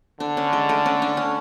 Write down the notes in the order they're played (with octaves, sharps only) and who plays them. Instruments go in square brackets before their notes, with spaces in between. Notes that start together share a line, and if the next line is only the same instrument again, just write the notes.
[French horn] D3 [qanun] D4
[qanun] C#4
G#3
A3
C#4
D4
C#4